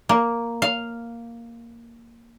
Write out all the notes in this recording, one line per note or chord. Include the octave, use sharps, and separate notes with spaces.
A#3
F5